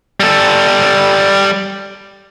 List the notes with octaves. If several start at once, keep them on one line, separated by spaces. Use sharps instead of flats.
G3 A4